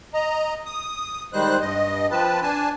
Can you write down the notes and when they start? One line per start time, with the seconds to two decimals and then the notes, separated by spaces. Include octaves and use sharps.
0.14 D#5 A#5
0.66 D#6
1.33 D#3 G3 G#3 C5 F#6
1.61 G2 D#5
2.11 F3 C4 B4 A5
2.42 D4 G#5 A5